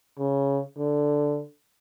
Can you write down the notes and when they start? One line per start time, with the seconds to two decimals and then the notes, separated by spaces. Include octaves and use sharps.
0.19 C#3
0.78 D3